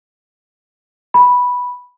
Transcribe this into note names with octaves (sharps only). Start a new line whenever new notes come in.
B5